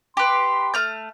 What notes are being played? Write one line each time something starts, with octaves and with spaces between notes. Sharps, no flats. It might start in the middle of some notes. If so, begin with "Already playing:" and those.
G4 B4 C6
A3 F6 G6